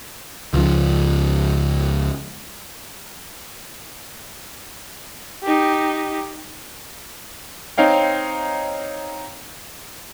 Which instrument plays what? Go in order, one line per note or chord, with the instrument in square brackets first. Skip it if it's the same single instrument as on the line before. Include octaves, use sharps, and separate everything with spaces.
[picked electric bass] C#2 F3
[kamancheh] D#4 G4
[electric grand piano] C4 D#4 C#5 F5 G5